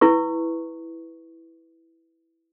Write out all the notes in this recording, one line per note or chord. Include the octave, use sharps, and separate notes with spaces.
E4 B4 C#6